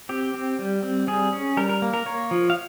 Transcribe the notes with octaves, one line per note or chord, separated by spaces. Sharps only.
C4 G4
C4
G3
C4
G3 G#4
C#4
G3 A#4
A#4
A#3
A#4
A#3 C#5
F3
F5